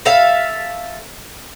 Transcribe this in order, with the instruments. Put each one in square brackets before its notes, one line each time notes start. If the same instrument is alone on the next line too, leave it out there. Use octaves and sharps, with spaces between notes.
[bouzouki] A4 E5 F5